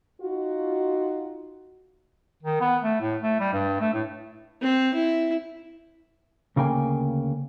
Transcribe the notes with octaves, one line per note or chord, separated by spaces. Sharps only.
D#4 F4 F#4
D#3
B3
A3
A2
A3
G3
G2
A3
A2
C4
E4
D2 C#3 A#3 G5 G#5